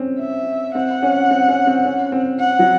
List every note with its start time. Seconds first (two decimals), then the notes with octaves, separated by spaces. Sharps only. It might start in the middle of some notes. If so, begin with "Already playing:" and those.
Already playing: C4 C#4
0.20 E5
0.75 C4 F#5
1.02 C#4
1.31 C4
1.48 C#4
1.67 C4
1.85 C#4
2.12 C4
2.40 F#5
2.59 F#3